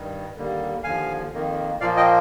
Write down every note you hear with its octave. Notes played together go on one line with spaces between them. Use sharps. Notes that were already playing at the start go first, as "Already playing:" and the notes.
Already playing: G2 D#3 G3
D#2 D3 G3 A#3
D#2 D3 F3 F5 G#5
F2 D#3 A#3
A#2 F3 A#3 D5 F5
D#5 G5